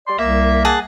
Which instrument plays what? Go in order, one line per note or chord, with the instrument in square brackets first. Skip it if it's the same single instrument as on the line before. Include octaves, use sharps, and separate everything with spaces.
[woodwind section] G3 D5 C6
[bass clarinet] C2 [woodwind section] A#3 [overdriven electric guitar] E5
[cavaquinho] G#4 F#5 A5